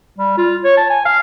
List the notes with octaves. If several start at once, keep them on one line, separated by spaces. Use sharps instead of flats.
G3
F4
C#5
A5
G#5
F5